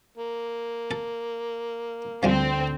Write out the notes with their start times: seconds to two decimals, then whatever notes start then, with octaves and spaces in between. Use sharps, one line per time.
0.18 A#3
0.91 A4
2.23 D2 D3 F3 G3 G#3 C4